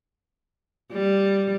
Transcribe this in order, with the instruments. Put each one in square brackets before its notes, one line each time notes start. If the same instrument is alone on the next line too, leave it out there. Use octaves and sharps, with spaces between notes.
[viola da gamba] G3